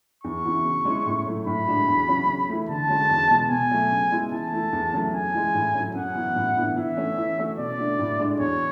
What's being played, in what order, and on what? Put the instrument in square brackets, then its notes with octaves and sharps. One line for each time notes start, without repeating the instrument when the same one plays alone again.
[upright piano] E2 [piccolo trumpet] C#6
[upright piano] C#3 E3 B3 F#4
C#3
G#3 C#4 E4
A2
F#3 A3 E4
[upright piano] A2 [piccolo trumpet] B5
[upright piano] G#3 D4 F#4
E2
C#3 F#3 C#4 F#4
C#3
E3 A3
[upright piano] D3 [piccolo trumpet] A5
[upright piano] G#3 C#4 F#4
E2
B2 G#3 B3
[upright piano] B2 [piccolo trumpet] G#5
[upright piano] F#3 A3
C#3
G#3 B3 E4
[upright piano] E3 [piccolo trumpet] A5
[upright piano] A3 E4
E2
C#3 F#3 A3
[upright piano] F#2 [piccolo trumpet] G#5
[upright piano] E3 G#3
A2
F#3 C#4
[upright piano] F#2 [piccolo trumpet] F#5
[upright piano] E3 B3 F#4
A2
E3 B3 D4
[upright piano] E3 [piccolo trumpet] E5
[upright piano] A3 C#4
E3
A3 C#4 F#4
[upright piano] B2 [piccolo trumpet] D5
[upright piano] A3 D4 F#4
A2
G#3 D4 F#4
[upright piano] E2 [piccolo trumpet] C#5